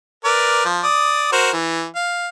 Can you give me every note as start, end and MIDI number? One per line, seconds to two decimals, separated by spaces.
0.25 0.65 70
0.25 0.65 71
0.25 0.65 74
0.65 0.81 53
0.83 1.29 74
0.83 1.29 87
1.32 1.51 66
1.32 1.51 70
1.32 1.51 72
1.53 1.86 52
1.96 2.28 77